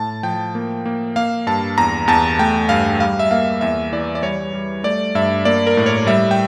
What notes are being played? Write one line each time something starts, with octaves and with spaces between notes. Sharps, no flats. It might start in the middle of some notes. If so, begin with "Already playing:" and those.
Already playing: A2 A5
F3 G5
A#3
A#3
A#3 F5
G2 A5
E2 A#5
E2 A5
A3 G5
G2 F5
G3 F5
E5
A#3 F5
E2 E5
E3 D5
D5
G3 C#5
G3
A3 D5
G2 E5
A#3 D5
A#4
A2
C#5
G3 E5
G5